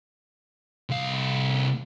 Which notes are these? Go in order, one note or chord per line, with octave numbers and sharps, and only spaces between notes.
C2 F5